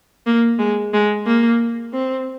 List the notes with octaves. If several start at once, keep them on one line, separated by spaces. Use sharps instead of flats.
A#3
G#3
G#3
A#3
C4